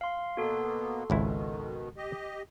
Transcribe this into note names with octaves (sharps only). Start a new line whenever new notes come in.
F5 C6
B2 A#3 B3 F#4 A4 C6
G#1 C#2 B2 D#3 E4
G4 D#5